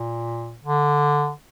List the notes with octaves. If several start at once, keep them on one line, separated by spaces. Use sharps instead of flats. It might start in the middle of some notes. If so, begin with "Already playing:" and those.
Already playing: A#2
D3